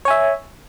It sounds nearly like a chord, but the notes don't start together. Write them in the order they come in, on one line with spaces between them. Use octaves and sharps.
C#5 G#5 E5